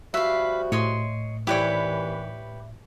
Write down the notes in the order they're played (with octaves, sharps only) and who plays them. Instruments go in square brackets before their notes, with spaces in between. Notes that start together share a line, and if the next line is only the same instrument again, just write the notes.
[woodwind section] F3 G3 F#4 [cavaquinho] B4 F5 [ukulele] E5
[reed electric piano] A2 [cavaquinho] C#5 D#5 C6
[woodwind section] D#2 C3 E3 [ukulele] E4 D5 [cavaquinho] G4 B4 C#5